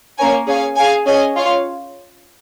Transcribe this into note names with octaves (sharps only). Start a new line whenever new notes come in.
A#3 C#4 A#4 C#5 G#5
C#4 G#4 C#5 F5 G#5
G#4 F5 G#5
C#4 G#4 D#5 G#5
F4 C#5 F5